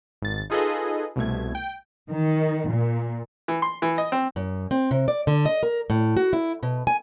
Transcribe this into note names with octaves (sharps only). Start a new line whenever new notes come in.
G#1 A6
D#4 F4 G#4 A4 B4 D#5
C2 B2 A3 G#6
G5
D#3
A#2
E3
C6
E3
D#5
C4
F#2
C4
C3
D5
D3
D#5
A#4
A2
F#4
E4
B2
G#5